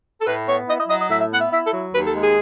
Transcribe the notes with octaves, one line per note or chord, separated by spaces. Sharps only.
A4
A2 B4
B3 C#5
E4 D#5
D#5
F#3 D#5
D#5
A2 E5
E5
B3 F#5
E5
E4 E5
A4
F#3
D#2 B4
A4
G#3
G#4